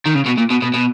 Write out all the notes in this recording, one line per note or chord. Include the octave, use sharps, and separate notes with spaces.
D#3
C#3
B2
A#2
B2
B2
B2